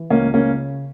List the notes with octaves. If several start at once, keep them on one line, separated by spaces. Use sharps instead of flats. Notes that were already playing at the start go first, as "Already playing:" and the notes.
Already playing: E3
C#2 A#3 C#4
C#3 A#3 C#4